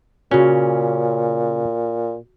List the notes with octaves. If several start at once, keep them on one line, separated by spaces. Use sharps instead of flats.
A#2 C#3 C#4 F#4